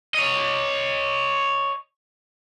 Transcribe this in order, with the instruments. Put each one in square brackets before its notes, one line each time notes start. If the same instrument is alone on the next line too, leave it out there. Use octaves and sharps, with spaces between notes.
[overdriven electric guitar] C#5 D#5